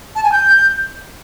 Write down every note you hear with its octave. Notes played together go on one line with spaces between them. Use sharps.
A5
G#5
G6